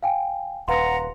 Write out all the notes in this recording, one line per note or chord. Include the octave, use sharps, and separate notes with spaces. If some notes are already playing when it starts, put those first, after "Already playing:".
F5 G5 G#5
D#1 B4 F5 F#5 A#5 C6